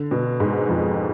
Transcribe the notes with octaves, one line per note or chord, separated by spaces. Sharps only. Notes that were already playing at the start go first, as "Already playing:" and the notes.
Already playing: D3
B2
G#2
F2